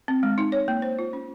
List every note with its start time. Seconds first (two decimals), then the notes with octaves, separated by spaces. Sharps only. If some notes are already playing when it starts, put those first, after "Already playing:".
0.08 C4
0.23 G#3
0.38 D#4
0.52 C#5
0.68 A#3
0.82 C5
0.99 F4
1.13 C#4